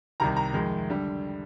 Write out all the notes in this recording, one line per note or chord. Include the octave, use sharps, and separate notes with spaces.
C2 C3 D#3 A#5
A#5
F2 D#3 G#3
D3 G3